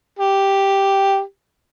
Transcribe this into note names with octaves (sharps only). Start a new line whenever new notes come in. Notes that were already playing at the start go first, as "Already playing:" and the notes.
G4